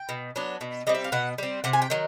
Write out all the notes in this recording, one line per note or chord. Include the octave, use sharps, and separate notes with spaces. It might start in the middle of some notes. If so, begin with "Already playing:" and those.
Already playing: G5
B2
F#3 B3 D4
B2
G3 C4 D#5
E5
F5
B2 F#5
G3 C4
C3 F#5
G#5
G5
D#3 F#3